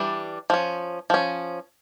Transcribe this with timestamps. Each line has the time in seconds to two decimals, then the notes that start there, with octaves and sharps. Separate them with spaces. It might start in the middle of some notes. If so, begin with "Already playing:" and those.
Already playing: E3 G3 D4
0.50 F3 C#4
1.10 F3 C#4